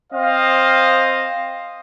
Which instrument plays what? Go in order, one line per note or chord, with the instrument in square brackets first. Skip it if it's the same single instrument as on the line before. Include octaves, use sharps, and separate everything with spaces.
[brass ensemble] C4 C5 D#5 F5